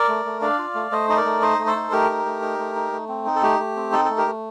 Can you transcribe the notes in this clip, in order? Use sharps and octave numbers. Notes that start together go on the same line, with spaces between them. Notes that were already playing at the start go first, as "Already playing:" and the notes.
Already playing: A#4 D5
A3
A3
D4 D5 F5
F4
A3
A3 C5 D#5
D#4 D#5
A#4 D5
A3
D#4 C5 D#5
A3
A4 C5
D#4
A3 G4 A#4
D#4
A3
D#4
A3
D#4
A3
C4
D#4
A4
A3 G4
A3
C4
D#4 A4
A3 A4
G4 A#4
A3